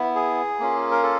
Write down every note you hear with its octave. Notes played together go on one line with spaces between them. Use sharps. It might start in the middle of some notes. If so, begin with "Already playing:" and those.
Already playing: B3 E4
G#4
A#3 C#4 F4
A#4
A4